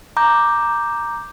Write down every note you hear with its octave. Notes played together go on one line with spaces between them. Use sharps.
A#5 D6 G6